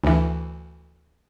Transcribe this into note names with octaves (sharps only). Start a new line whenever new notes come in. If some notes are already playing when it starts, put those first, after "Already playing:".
D2 E3